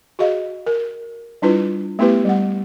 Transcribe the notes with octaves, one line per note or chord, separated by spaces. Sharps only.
F#4 G#4 D#5 F5
A#4
G3 D4 E4 F4 B4
A3 B3 E4 G4 B4
G3 F#5